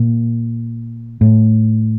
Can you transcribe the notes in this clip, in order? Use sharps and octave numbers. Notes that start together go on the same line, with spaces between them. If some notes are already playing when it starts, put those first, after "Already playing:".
Already playing: A#2
A2